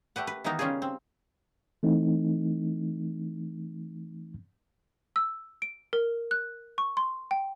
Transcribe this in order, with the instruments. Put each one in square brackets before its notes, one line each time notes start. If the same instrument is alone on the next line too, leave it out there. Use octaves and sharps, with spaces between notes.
[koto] A3 G4 B4 F#5
B4
D#3 E3 A#3 B3 D#4 A#4
C#3 G3 C#4 F4 G4 G#4
C4
[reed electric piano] E3 A3 C4 D#4
[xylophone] E6
D7
A#4
F#6
C#6
C6
G5